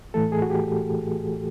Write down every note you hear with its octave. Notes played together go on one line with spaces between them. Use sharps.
A2 E3 A3 A4
G#4
F#4
G4